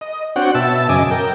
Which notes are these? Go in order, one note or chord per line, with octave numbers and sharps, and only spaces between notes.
D#5
C4 D4 F#4 C#5 F#5 G5
B2 E5 A5 E6
F#2 C#3 D#5 G#5 D6
A#4 G5